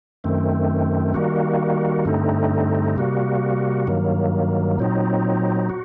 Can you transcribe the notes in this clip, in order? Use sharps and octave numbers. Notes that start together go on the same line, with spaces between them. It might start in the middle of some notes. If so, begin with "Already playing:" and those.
F#2 D#3 A3 C4
D#3 G3 A#3 F#4
G2 D3 A3 C4 D#4
C3 G3 A#3 F#4
G2 D#3 F#3 A#3
A#2 F#3 C4 D#4
F#4